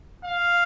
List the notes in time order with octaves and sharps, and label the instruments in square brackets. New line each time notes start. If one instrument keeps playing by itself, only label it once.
[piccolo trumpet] F5